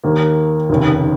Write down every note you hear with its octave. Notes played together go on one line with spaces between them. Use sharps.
D#2 D#3 A#3
F1 D#2 C#3